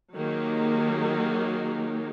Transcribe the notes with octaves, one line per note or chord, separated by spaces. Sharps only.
D#3 F#3 A#3 D#4 G4 G#4